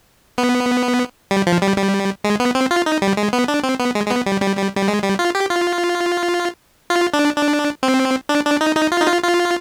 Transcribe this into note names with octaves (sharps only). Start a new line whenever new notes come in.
B3
G3
F3
G3
G3
G#3
B3
C4
F4
D#4
G3
G#3
B3
D4
C4
B3
G#3
G#3
B3
G3
G3
G3
G3
G#3
G3
F4
G4
F4
F4
D4
D4
C4
D4
D4
D#4
D#4
F4
D#4
F4
F4